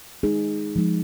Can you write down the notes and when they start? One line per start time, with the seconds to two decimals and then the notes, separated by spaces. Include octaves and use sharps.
0.23 G#3 D#4 G#4
0.76 F3 G#3 D#4